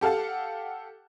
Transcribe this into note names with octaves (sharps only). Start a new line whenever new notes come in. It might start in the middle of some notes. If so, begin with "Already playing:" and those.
G4 A4 F5 F#5 A5